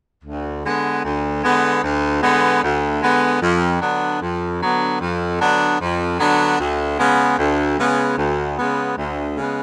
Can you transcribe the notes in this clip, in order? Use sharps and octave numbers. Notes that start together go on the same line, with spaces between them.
D2
D3 G#3 B3
D2
D3 G#3 B3
D2
D3 G#3 B3
D2
D3 G#3 B3
F2
D3 F#3 B3 D4
F2
D3 F#3 B3 D4
F2
D3 F#3 B3 D4
F2
D3 F#3 B3 D4
D2
C#3 G#3 B3
D2
C#3 G#3 B3
D2
C#3 G#3 B3
D2
C#3 G#3 B3